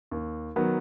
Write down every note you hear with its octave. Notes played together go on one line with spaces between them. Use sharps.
D#2
D#3 F#3 B3